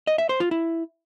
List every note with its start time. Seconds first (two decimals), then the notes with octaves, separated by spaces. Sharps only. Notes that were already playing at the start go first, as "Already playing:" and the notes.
0.07 D#5
0.18 E5
0.29 C5
0.40 F4
0.51 E4